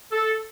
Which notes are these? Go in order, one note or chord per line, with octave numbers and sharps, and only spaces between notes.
A4